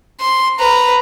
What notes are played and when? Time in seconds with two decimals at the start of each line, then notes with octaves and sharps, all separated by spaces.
0.20 C6
0.59 B4 A#5